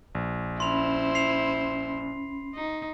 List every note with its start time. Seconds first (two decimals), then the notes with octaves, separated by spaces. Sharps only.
0.15 A#1
0.60 C#4 E4 C5 B5 C6 F7
1.15 C7 F7
2.55 D#4